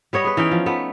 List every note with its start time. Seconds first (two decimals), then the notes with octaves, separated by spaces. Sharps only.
0.13 G3 B3 C#5 D#5
0.25 G#4 B4
0.37 E3 C#4 D#4 G5
0.51 F3
0.66 A3 B3